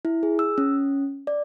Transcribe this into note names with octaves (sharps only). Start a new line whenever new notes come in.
E4
G#4
E6
C#4
D5